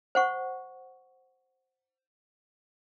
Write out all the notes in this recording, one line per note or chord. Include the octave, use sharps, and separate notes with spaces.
C5 F#5 C#6